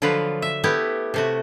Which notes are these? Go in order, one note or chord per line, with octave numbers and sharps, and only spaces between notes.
D3 F3 F#3 F4 B4
E5
A3 B3 E4 G4
C3 A3 F#4